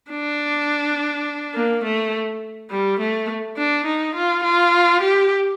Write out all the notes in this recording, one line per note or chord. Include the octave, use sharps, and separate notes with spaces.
D4
A#3
A3
G3
A3
D4
D#4
F4
F4
G4